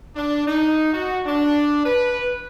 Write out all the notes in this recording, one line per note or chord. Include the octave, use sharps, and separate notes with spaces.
D4
D#4
F#4
D4
B4